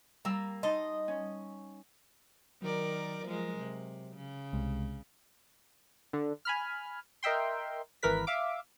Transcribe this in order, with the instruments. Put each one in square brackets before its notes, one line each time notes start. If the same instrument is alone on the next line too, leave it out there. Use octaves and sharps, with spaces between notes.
[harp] G3 A#5 E6 [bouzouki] A#3
[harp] D#4 A5 C6 [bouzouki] D#5
[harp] C#4
[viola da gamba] D#3 A#4 D5 [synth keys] F#3
[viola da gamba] F3 G#3 A#4
C3
C#3
[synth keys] C2 C3 G#3
D3
G#5 B5 F6
A#4 D#5 E5 G5 C6
G#1 E3 A#4 B4 B6
E5 F5 D6